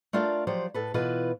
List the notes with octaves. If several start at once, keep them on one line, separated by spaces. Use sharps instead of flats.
A3 D4 F4 A#4 D5 F5
F3 F#3 G4 C5 D5
A2 A4 B4
B2 E3 E4 F4 B4